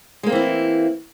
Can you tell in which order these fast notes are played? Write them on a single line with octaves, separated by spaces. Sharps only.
G#3 A#3 C4 E3 E4